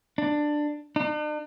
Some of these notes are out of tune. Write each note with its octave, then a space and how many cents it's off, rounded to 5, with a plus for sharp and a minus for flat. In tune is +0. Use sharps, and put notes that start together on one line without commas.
D4 +15
D4 +45